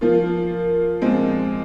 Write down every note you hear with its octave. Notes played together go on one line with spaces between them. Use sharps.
F3 A#3 F4
A#2 F3 G#3 C4